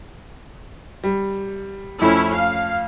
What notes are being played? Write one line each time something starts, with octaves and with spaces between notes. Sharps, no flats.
G3
F2 A3 C#4 E4
F5